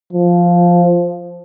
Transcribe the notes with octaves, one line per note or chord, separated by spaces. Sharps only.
F3